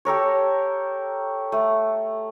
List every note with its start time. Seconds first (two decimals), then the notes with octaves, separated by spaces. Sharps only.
0.05 G4 A4 A#4 C#5
1.52 A3